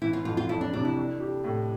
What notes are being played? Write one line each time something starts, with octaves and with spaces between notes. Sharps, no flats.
E3 E4
F4
F2 F4
F4
F2 E4
D4
C3 D4
E4
D4
G4
A2